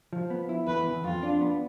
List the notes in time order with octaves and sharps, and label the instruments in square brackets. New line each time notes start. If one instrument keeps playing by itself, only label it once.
[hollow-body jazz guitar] F3
B3
E4
[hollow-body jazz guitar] E2 [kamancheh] B4
[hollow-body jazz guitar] E2
[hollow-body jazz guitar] F2 [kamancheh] F4
[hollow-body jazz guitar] D4
B3